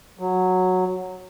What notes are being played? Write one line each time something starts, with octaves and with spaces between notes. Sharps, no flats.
F#3